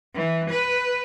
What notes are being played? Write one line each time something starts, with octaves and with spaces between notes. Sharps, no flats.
E3
B4